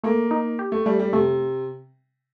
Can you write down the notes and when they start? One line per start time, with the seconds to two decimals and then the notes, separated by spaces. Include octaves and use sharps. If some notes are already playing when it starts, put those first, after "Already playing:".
0.03 A3 A#3
0.31 D#4
0.59 G4
0.72 A3
0.86 G3 A3
0.99 G3
1.13 C3 A3